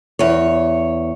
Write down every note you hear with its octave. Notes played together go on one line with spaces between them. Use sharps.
E2 C#5